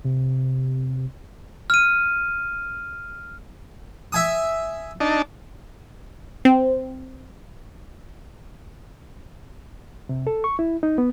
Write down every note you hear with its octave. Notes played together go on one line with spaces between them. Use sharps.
C3
F6 D#7
E5 G#5 D#6
D4 D#4 A5
C4
C3
A4
C#6
E4
D#4
B3